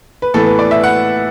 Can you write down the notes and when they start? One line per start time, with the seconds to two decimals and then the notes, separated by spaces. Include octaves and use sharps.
0.22 B4
0.34 A2 E3 B3 A4
0.46 B4
0.59 D5
0.71 E5
0.84 F#5